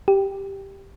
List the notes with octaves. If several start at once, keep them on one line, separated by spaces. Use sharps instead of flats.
G4